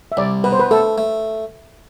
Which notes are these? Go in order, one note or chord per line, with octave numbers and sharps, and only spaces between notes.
E5
C2 D5
B2 B4
C5
B4
A3 A4
A3